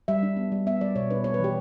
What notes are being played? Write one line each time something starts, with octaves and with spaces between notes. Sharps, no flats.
G3 E5
D4
B3
G3
B3 E5
G3 D5
B2 C#5
D4 B4
A#3 C#5
B4
E3
G4